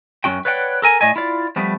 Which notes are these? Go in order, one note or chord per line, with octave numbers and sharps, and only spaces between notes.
F#2 C#4 F#4 G5
B4 C#5 D5 F#5 G5
A4 A#4 G#5
A2 D5 D#5 G#5
E4 F4 D5
F3 G3 A3 B3